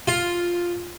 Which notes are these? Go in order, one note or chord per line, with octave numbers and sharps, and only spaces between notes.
F4